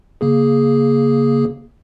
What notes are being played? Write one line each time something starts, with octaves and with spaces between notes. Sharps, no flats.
C#3 A#3 G#4